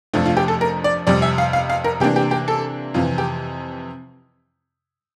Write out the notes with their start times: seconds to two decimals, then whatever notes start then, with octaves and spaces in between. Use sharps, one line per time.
0.14 F2 C3 F3 A3 D4 F4
0.26 F4
0.37 G4
0.48 A4
0.61 A#4
0.84 D5
1.07 F2 C3 G3 D5
1.22 E5
1.38 F5
1.53 F5
1.70 F5
1.84 A#4
2.00 C3 E3 A#3 D4 G4
2.16 G4
2.31 G4
2.48 A4
2.94 F2 C3 E3 F4
3.18 G4